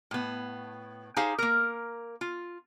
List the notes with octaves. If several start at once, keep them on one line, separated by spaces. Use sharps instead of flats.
A2 B3
D#4 G4 G#4 C5 F5
A#3 A#4
F4